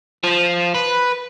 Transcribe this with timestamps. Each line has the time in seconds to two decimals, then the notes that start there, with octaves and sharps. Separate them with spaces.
0.24 F3
0.75 B4